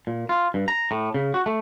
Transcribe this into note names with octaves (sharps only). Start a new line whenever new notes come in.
A#2
F4
G2
A#5
A2
C#3
F#4
A3